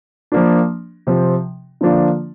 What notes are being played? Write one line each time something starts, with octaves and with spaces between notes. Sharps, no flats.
F3 A#3 D4
C3 F3 C4
D3 F3 A#3 D4 F4